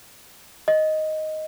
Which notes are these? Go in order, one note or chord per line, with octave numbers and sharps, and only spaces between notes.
D#5